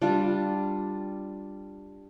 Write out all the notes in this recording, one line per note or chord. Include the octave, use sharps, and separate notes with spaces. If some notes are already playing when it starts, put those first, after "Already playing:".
G3 D4 F4